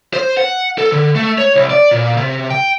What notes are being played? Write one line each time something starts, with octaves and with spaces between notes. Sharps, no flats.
C5
F#5
A4
D3
A3
C#5
C2
D5
A#2
C3
G5